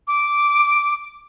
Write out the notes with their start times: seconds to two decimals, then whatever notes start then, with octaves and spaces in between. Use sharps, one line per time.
0.07 D6